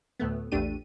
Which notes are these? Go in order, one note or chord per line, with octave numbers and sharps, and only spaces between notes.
D2 A2 A3 B3
A#1 E2 A3 D4 G4 D#7